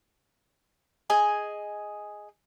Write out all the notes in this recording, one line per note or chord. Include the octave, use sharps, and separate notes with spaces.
G#4 D#5 G#5